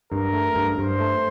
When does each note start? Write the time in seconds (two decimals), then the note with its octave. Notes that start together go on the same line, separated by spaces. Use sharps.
0.12 G2 A#4
0.33 A3
0.55 G2
0.78 G2 C5
1.00 A3